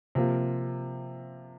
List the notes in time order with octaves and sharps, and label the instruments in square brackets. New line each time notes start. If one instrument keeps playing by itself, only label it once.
[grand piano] C3 F3 A#3 F4